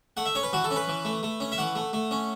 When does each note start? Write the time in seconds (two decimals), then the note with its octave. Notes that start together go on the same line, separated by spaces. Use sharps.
0.17 A3 F#5
0.26 E5
0.35 C#4 C#5
0.43 B4
0.53 E3 F#4
0.64 A4
0.71 C#4
0.76 B4
0.88 E3
1.05 A3
1.23 A3
1.40 C#4
1.52 E5
1.58 E3 F#5
1.75 A3
1.93 A3
2.11 C#4